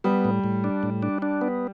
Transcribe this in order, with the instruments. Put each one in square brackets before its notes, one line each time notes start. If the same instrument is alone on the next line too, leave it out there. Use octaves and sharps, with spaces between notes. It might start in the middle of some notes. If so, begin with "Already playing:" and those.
[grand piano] G3 [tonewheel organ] B3
[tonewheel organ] A2
A2
D4
A2
D4
D4
B3